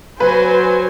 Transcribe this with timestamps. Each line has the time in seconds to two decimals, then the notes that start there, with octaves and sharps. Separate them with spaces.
0.20 F#3 B4 C5 G#5